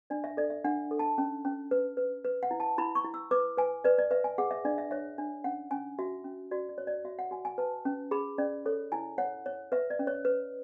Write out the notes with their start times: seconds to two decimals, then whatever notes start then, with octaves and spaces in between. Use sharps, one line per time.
0.10 D4 D5
0.24 E5
0.37 A4 D5
0.50 E5
0.65 D4 F#5
0.91 A4
0.99 A5
1.18 C#4
1.45 C#4
1.71 B4
1.97 B4
2.25 B4
2.43 F#5
2.51 E4
2.60 A5
2.78 E4 B5
2.95 C#6
3.05 E4
3.14 E6
3.31 B4 D6
3.57 B4 G#5
3.84 B4 D5
3.98 D5
4.11 B4 E5
4.24 G#5
4.38 G#4 F#5
4.51 E5
4.65 D4 D5
4.78 E5
4.91 C#5 E5
5.18 D4
5.44 C#4 F#5
5.71 C#4 G#5
5.99 F#4 E5
6.24 C#4
6.51 F#4 D5
6.69 D5
6.78 C#5
6.87 D5
7.05 F#4 E5
7.19 F#5
7.31 F#4 G#5
7.45 G#5
7.58 B4 A5
7.85 C#4
8.11 G#4 B5
8.38 C#4 D5
8.66 A4 C#5
8.92 E4 G#5
9.18 C#5 F#5
9.46 C#5
9.72 B4 E5
9.90 D5
9.99 C#4
10.07 C#5
10.25 B4